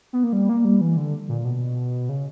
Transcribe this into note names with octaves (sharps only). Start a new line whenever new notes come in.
B3
A#3
G3
A#3
G3
E3
D3
A#2
B2
C#3